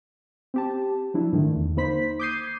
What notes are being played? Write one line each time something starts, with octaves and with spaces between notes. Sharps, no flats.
C4 G4 A5
F3 F#3 D4 E4
G#2 D3 D#3 A3
E2
A#3 D#4 C5 B5 B6
D6 D#6 G6 G#6 C7 D#7